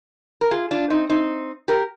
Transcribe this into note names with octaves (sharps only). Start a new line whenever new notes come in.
A#4
F4 G#4
D4 F4
C4 D#4
C4 D#4
G4 A#4